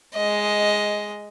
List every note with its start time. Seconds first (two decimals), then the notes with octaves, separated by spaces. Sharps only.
0.15 G#3 D#5